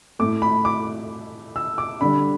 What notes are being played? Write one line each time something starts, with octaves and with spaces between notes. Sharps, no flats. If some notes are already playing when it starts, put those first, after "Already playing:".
A2 A3 D6
B5
D6
E6
D6
D3 G3 B5